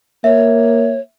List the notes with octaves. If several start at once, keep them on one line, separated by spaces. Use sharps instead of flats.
A#3 C#5 E5